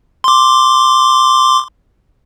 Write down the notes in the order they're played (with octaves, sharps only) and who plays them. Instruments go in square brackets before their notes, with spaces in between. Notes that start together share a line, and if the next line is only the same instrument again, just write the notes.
[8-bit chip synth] C6 D6